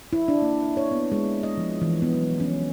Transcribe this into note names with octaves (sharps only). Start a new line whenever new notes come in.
E4
D4
A#3
C#5
B3
G#3
D#5
F3
E3
B3
F#3
C#4